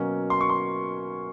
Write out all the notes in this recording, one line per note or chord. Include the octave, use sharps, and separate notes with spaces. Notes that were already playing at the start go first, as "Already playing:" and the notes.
Already playing: B2 F#3 A#3 C#4
C6
C#6
C6